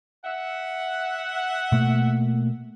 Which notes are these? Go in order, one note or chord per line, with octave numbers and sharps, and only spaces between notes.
E5 F#5
B2 A3 A#3